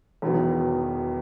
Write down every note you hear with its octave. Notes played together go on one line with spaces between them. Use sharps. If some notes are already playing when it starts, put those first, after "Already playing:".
E1 E2 D#3 F#3 B3